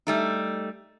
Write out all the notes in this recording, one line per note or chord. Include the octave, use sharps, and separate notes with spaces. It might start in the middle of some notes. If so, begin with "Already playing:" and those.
G3 A3 D#4